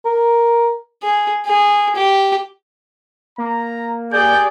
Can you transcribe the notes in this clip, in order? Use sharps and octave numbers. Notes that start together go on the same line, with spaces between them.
A#4
G#4
G#4
G4
A#3 A#5
G4 G#4 D5 G6